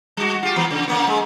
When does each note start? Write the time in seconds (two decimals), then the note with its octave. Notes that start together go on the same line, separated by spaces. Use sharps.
0.17 G3 F#4
0.43 F4 G4
0.56 E3 B3
0.71 C#3
0.88 C#3 A#3 B3
1.07 G#3